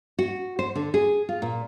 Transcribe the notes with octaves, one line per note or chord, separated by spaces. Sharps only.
F#4
C5
D3
G#4
F4
A#2